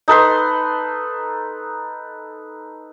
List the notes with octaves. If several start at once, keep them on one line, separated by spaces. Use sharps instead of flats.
D#4 A4 B4 C6